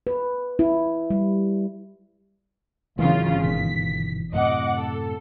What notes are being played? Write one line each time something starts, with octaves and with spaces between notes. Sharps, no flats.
B4
E4
G3
G#1 C#3 E3 F#3 G#3 F4
G1 B2 D#3 B6
F#2 A2 C3 D#5 F#5 D6
A4